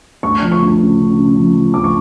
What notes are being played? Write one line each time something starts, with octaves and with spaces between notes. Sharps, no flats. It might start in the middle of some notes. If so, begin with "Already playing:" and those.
D2 C#6
F3
C#6
D2
C#3
C#3
C#3
F3
F3
D2 D6
C#6